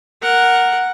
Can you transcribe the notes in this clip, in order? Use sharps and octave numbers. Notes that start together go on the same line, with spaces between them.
A#4 F#5